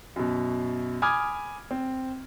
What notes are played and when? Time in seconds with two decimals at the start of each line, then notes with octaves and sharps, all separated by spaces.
0.16 F#2 B2
1.02 G#5 B5 D6 D#6 F6 G#6
1.71 C4